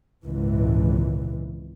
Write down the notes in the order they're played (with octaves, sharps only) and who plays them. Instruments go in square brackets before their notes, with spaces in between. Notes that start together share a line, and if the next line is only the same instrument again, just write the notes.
[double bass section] G#1 C#2 A#2 E3